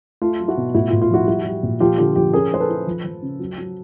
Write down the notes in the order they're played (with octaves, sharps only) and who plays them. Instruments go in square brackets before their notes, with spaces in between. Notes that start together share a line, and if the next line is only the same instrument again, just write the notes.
[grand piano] A3 F4
F#3
E4 F#4
B2
A2 E4 F#4
F4
A2
F4
F3 E4 F#4
G3 E4 F#4
G3
A#2
F3 F4 G4
D3 F4 G4
F3 F4 G4
C#4 G#4 A#4
E4 C5
A4 B4
E4
F3
F3
C#3
F#3
F#3